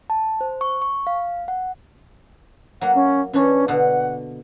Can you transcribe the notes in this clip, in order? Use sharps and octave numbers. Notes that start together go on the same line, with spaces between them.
A5
C5
C#6
C#6
F5
F#5
F#3 A#3 F#5
C#4
E3 C#4 D4
B2 D3 F#5